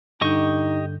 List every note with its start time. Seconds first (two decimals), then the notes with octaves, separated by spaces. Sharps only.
0.21 G2 D3 D#4 G4 D#5 C#6 G6